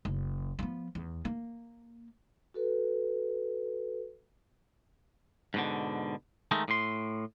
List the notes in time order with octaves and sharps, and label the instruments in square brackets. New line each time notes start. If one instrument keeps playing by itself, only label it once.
[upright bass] F#1
F3 B3
E2
A#3
[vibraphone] F#4 A4 B4
[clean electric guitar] G#2 B2 D3
D#3 G#3 A3 D#4
A2 C6